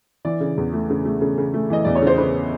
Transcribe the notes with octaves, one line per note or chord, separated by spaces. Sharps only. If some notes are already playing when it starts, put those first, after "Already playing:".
E3 D5
C#3
E2
A3
C#3
A3
C#3
C#3
A3
E3 D#5
E2 D5
C#5
C#3
C5
C#3 B4